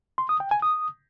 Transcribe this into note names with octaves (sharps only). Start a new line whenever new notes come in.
C6
D#6
G5
G#5
D#6